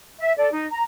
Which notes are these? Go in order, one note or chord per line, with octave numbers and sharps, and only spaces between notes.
E5
A4 D5
D#4
A#5